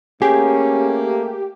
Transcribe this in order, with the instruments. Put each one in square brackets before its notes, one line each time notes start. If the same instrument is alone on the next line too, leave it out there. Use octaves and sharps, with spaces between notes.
[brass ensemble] A3 A#3 [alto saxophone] C#4 [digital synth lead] G4 [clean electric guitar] G#4